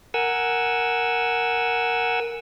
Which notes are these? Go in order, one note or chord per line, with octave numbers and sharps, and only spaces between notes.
A#4 F#5 G#5 E6